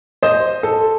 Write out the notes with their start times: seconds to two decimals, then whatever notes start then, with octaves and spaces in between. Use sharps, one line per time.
0.23 C5 D#5
0.63 A4